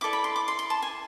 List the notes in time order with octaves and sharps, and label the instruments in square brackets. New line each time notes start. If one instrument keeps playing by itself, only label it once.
[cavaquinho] E4 A4 D5 D6
B5
C6
D6
C6
C6
A5
G#5